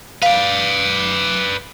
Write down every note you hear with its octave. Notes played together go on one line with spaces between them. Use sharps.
B4 D5 F5